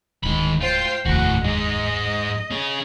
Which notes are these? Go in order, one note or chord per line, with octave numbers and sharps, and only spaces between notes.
D1 G#2 D#3 B5
F4 C5 G5
F1 D#2 A2 F#4 F#5
G#2 G#3 D#5
C#4 G#4